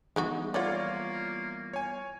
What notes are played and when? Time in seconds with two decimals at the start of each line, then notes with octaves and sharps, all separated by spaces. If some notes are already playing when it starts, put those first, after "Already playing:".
0.16 E3 G3 G#3 B3 D#4 F#4
0.54 F3 A#3 F4 C#5 D5 F#5
1.73 C#5 G#5